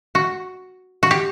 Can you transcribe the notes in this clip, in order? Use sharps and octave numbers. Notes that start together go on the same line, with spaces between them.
F#4
F#4
G4